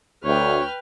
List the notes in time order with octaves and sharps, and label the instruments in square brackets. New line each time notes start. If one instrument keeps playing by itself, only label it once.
[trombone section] D2 [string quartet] B4 G5 F6 [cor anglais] C#5